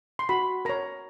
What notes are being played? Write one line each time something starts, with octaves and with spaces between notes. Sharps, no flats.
C6
F#4 B5
A#4 C#5 A#5